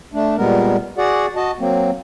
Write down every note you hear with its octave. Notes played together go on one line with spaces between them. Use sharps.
A3 D4
A#2 G3 G#3 B3 A#4
F#4 G#4 D5 F#5
F#4 D#5 A5
F#3 A#3 C4